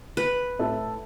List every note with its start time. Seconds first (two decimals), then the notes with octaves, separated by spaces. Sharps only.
0.17 B4
0.59 A2 A4